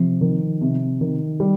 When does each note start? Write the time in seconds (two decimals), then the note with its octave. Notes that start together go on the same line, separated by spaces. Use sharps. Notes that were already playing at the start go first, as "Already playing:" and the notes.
Already playing: C3 F3
0.21 D#3
0.61 C3
1.01 D#3
1.40 G3